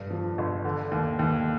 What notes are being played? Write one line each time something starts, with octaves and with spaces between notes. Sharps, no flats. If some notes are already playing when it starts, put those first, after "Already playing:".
Already playing: F1 G2
F3
G1
D3
D#2
D#2